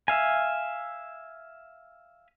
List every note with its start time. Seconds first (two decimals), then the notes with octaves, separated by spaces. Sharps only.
0.08 E5 F5 G#5